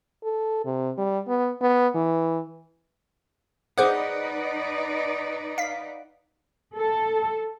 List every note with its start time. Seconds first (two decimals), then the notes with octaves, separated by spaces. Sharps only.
0.24 A4
0.65 C3
0.98 G3
1.28 B3
1.62 B3
1.95 E3
3.78 D#4 G#4 B4 C5 D5 F#5 D6
5.58 F5 B6
6.76 A4